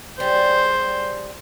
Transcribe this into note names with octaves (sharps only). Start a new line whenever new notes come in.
G3 G#4 C5